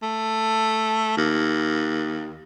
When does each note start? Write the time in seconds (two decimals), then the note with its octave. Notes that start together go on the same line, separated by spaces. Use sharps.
0.03 A3
1.17 D#2